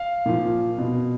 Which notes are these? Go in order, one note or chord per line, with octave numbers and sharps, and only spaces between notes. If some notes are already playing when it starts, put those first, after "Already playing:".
Already playing: F5
A#2 F3
B2